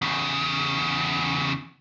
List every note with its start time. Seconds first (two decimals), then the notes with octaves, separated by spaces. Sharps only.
0.02 E2 C#3